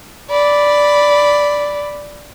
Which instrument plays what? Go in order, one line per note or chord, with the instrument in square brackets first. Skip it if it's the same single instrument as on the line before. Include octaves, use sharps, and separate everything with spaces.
[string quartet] D5 B5